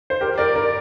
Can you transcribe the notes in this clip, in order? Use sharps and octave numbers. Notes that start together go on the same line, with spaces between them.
C5
G4 A#4
A#4 D5
A#4 D5